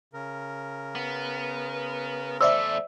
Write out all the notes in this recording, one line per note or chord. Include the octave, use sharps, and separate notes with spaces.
C#3 A#4
B3
E2 A3 C5 D5 E5 E6